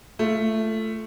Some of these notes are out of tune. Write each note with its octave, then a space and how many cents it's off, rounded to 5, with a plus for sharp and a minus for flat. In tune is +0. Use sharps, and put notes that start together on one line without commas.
A3 +0 F4 -20